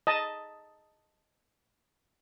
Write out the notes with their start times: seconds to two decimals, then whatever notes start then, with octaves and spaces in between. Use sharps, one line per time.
0.07 D#5 A5